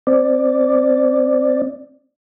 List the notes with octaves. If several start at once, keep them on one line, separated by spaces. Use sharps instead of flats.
C4 D5